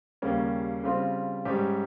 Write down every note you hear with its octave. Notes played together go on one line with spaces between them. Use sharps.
D#2 C#3 G3 A#3 C#4
C#3 G3 C4 F4
G#2 G3 C#4 G4